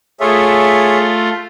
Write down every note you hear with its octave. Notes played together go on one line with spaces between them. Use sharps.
A3 F4 G#4 C#5 E5